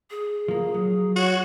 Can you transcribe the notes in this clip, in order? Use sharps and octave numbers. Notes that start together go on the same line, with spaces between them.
G#4
F3 A#3
F#3
F#4 C#5